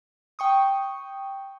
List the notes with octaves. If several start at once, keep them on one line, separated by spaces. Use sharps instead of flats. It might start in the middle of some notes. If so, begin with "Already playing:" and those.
G5 C#6 D#6